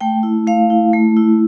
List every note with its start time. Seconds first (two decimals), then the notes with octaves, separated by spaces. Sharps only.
0.01 A3 G5
0.23 E4
0.47 A3 F5
0.70 E4
0.93 A3
1.17 E4